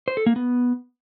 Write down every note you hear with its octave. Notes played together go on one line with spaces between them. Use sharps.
C5
A4
A#3
B3